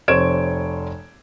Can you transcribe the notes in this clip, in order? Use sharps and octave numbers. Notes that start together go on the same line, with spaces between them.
F1 C5 C#5 G#6 D7 E7